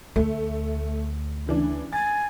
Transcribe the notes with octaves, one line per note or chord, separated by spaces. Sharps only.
D2 A3
C#3 E3 D4
G#5 A6